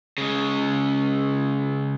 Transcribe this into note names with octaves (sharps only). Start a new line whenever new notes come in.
C#3 G#3